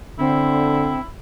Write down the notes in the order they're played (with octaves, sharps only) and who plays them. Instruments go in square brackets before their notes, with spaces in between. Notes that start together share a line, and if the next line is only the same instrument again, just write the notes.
[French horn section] D3 [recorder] C4 [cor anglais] E4